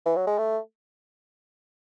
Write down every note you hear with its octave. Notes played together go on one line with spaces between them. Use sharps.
E3
F#3
G#3
A3